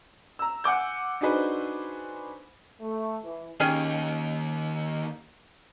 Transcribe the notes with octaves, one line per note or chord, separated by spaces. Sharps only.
A#5 E6
F#5 G#5 D6 G6
D4 D#4 F#4 G#4 B4 C5
A3
E3
D#2 D#3 C#4 G4 G#4